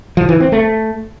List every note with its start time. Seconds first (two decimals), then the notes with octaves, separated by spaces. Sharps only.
0.17 F3
0.29 E3
0.40 C4
0.52 A3